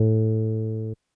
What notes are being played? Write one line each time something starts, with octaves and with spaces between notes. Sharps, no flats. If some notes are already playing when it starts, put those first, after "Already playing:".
Already playing: A2